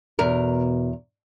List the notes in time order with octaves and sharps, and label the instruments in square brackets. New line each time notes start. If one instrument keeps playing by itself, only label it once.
[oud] E2 A#4 [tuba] B2